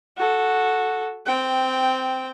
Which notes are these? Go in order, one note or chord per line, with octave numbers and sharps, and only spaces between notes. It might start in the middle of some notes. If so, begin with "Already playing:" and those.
F#4 A4
C4 G5